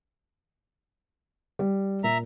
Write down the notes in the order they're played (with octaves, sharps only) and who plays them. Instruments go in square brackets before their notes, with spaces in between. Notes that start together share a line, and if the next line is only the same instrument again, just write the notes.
[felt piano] G3
[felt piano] A#2 [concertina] E5 A#5